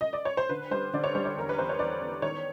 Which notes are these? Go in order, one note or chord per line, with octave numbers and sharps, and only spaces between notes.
D#5
D5
C#5
C5
D3 B4
G3 C5
D3 D5
C#5
G3 C5
C#5
E2 A#4
B4
E2 C5
C#5
E2 D5
E2
D#3 C#5